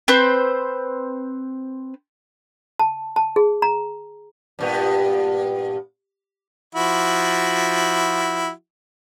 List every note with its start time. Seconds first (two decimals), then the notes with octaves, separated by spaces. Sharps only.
0.08 C4 B4 C5
2.79 A5
3.16 A5
3.36 G#4
3.62 A#5
4.59 G2 A#2 B3
6.75 F3 E4 F#4